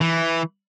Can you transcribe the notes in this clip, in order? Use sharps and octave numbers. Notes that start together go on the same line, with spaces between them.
E3